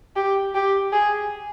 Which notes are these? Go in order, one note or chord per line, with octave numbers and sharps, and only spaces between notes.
G4
G4
G#4